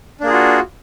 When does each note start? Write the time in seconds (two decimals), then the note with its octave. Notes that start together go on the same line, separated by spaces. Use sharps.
0.20 D4
0.24 A#3
0.27 G#4
0.30 F4
0.33 F#4